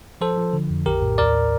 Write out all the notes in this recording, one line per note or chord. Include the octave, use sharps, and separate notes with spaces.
F3 A4 C5
F3
D3
F2
A#1 G4 A#4
A2
D#2 A#4 D5